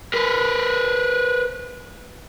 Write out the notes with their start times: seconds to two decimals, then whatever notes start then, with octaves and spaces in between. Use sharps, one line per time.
0.14 A#4 B4